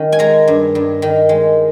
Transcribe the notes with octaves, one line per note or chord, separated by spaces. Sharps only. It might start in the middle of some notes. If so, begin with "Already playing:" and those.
Already playing: D#3 C#4
G#5
G#3 A#5
G2
G2
D#3
G#3